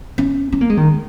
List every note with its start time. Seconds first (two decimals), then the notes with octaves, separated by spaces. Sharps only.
0.18 C#4
0.52 C#4
0.61 A#3
0.69 G#3
0.77 D#3